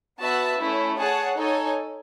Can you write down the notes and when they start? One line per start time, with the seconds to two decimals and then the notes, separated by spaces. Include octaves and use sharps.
0.20 B3 F#4 B4 E5 A5
0.59 A3 C#4 E4
0.98 G#4 C#5 F#5 A5
1.37 D#4 A4 C#5 G#5